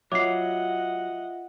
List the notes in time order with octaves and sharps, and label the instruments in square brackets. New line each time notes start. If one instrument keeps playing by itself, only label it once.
[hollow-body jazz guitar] F#3 [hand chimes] F4 E5 [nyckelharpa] D#5 F#5 [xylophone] D6 C7